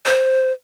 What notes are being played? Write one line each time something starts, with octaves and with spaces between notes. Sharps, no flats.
C5